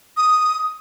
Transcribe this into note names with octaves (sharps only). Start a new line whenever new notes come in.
D#6